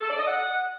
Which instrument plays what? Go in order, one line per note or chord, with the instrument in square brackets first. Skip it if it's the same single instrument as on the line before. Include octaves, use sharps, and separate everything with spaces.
[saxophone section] A4
D5
D#5
F#5